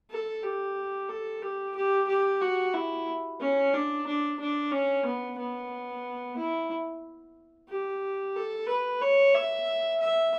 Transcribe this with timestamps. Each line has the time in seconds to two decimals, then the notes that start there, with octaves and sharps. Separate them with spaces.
0.10 A4
0.43 G4
1.09 A4
1.42 G4
1.76 G4
2.08 G4
2.41 F#4
2.74 E4
3.40 C#4
3.74 D4
4.06 D4
4.39 D4
4.72 C#4
5.05 B3
5.38 B3
6.37 E4
7.69 G4
8.35 A4
8.68 B4
9.01 C#5
9.34 E5
10.00 E5